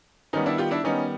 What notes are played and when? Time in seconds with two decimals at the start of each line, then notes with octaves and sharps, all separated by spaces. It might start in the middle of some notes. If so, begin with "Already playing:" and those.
0.33 D#3 G3 B3 C#4 D#4
0.46 D4 E4
0.58 F4 G4
0.71 D4 E4
0.84 D#3 G3 B3 C#4 D#4